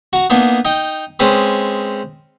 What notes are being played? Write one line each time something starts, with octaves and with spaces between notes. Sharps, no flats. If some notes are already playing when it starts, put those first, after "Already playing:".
F#4 A#5
A#3 B3 D4 D#4
D#4 D#5 G5
G#3 C4 C#4 B4 D#6